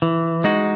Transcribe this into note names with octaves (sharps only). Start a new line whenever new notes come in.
E3
G#3 D#4 F#4